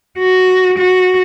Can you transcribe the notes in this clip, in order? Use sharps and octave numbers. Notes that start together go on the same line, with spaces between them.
F#4
F#4